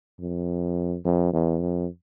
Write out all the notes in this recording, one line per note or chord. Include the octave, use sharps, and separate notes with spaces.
F2
F2
E2
F2